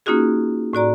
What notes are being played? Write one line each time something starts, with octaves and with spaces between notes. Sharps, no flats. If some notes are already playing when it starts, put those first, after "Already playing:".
A#3 C#4 D#4 F4 F#4 G#4
A2 F#4 D5 A#5